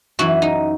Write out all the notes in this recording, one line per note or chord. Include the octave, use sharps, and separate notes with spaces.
F#2 E3 F#4
D#4